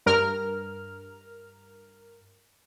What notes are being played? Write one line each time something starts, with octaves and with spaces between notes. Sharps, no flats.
G2 A#4 F6